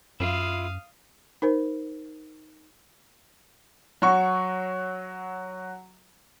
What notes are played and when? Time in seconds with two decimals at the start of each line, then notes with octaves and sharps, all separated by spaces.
0.20 F#2 E4 F4 F5 D#6
1.42 D#4 A#4 C5
4.02 F#3 F#4 C#6